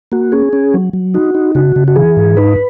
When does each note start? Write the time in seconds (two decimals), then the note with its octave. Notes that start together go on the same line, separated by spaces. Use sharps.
0.12 A#3 F#4
0.32 C#4 G#4
0.53 C#4
0.74 F#3
0.93 F#3
1.14 D#4 F#4
1.34 D#4
1.55 C#3 F#4
1.76 C#3
1.88 F#4
1.96 E3 G#4
2.17 G#2
2.37 D#4 B4